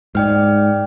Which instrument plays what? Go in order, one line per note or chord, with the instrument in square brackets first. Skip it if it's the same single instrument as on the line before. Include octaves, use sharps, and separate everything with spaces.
[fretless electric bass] G#2 [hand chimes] D5 G5 F6